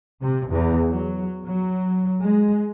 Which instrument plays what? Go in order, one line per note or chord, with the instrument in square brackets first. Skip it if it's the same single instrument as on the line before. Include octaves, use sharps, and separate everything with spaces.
[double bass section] C3
E2
F#3
F#3
G#3